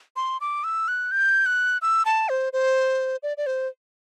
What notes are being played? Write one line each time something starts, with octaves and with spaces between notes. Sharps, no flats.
C6
D6
E6
F#6
G6
F#6
E6
A5
C5
C5
D5
D5
C5